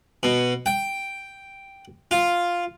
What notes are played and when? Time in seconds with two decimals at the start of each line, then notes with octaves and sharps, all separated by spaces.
0.23 B2
0.66 G5
2.11 F4